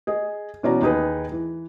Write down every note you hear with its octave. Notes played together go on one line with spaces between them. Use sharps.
G#4 D#5
B2 E3 C#4 F#4 D5 A#5
D#2 D#4 G#4 B4
E3